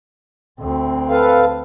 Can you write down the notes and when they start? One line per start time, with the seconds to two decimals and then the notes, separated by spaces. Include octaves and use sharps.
0.60 D2 C4
1.09 A4 B4 F5